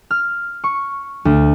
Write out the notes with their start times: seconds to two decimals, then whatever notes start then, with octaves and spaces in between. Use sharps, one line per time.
0.11 F6
0.64 C#6
1.25 D2